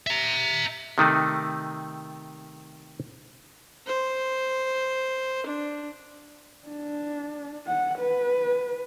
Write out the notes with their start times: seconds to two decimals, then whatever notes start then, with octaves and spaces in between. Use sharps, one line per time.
0.07 E5 A#5
0.98 C3 D#3 A3 D#4
3.87 C5
5.46 D4
6.68 D4
7.67 F#5
7.99 B4